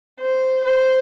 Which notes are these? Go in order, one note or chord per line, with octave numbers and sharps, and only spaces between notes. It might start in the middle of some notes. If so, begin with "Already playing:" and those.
C5
C5